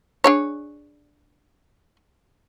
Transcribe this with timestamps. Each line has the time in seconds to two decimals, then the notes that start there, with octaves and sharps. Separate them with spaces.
0.24 D4 G#4 C#5